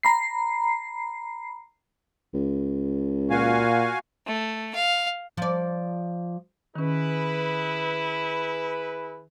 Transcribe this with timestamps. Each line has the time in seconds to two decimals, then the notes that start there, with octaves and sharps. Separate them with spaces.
0.03 A#5 B5 C7
2.34 C#2
3.30 A#2 F#4 F5 G#5
4.27 A3
4.75 F5
5.37 F3 D5
6.76 D#3 C#4 E4 G#4 B4